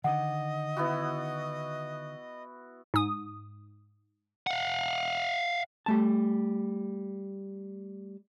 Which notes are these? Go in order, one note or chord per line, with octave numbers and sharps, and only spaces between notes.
D3 D#3 D#5 F#5
B3 E4 F#4
G#2 D#6
F5 F#5
G3 A3 A5